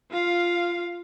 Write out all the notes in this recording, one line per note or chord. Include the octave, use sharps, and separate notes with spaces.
F4 F5